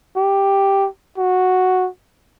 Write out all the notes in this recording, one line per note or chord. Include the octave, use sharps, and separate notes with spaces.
G4
F#4